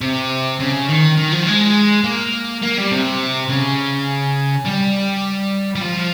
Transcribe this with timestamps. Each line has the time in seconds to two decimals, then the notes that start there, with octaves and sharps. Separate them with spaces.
0.01 C3
0.60 C#3
0.89 D#3
1.17 D#3
1.32 F3
1.47 G#3
2.04 A#3
2.62 A#3
2.77 G3
2.91 C3
3.50 C#3
4.65 G3
5.76 G3
5.81 F3